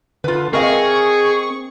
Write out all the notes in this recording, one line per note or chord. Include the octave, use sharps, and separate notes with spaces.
D3 F4 B4
C4 G#4 A#4 D#5 F5 C#6